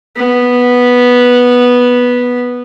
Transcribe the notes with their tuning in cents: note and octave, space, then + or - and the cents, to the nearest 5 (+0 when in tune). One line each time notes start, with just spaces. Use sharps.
B3 -5